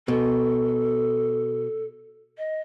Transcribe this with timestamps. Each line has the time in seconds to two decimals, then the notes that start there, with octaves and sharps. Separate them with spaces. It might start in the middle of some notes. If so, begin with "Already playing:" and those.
0.08 B2 A4
2.38 D#5